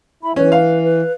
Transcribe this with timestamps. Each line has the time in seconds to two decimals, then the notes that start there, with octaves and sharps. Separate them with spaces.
0.23 E4 B5
0.36 E3 C#4 B4
0.52 F5
0.84 B4